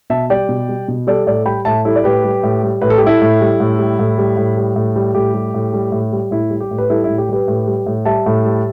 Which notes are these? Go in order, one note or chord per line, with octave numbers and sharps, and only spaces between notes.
B2 E5 A5
G3 D5 G5
B2
G3
B2
G3 A4 D5
A2 A4 D5
G3 G5 B5
A2 E5 A5
G3 E4 A4
D5
A2 G4 B4
G3
A2
G3
A2 B4
A4
G4
G3
E4 A4
A2
G3
A2
G3
A2
G3
A2
G3
A2
G3
A2 G4
G3
A2
G3
A2
G3
A2 E4
G3
G4
A2
B4
G3 E4 A4
A2 E4
G4
G3 G4 B4
A2
G3
A2
G3 E5 A5
A2
G3